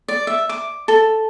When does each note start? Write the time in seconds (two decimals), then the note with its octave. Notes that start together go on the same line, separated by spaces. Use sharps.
0.08 D5
0.27 E5
0.49 D6
0.88 A4